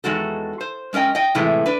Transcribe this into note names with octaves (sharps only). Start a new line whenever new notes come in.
E2 D#3 G#3 F#4 A4
C5
G#3 C#4 A#4 D#5 G5
D#5 G5
A2 C3 E3 G#3 A3
D4 B4